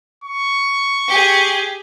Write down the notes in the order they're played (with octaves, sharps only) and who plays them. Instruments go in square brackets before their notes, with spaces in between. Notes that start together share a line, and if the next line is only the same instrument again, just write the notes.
[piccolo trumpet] C#6
[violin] G4 G#4